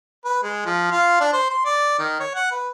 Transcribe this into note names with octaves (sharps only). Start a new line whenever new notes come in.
B4
G#3
F3
F4
D4
C5
C6
D5
D#3
C#5
F#5
B4